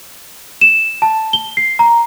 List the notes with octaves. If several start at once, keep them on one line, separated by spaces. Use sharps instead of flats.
E7
A5
G7
C7
A#5